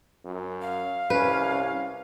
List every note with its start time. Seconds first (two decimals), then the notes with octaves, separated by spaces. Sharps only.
0.25 F#2
0.62 F5
1.10 C2 C#4 B4